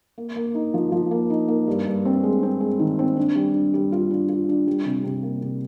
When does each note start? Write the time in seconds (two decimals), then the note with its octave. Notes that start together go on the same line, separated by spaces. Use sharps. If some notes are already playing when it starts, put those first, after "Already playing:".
0.18 A#3
0.36 A#3
0.55 D#4
0.74 F3
0.92 F3
1.11 A#3
1.30 D#4
1.48 A#3
1.67 G2
1.86 G2
2.05 C4
2.23 G#3
2.43 C4
2.60 G#3
2.80 D#3
2.99 C4
3.17 D4
3.36 G3
3.54 D4
3.74 G3
3.92 F4
4.10 D4
4.29 F4
4.49 D4
4.67 G3
4.85 C3
5.04 C3
5.23 A#3
5.41 C3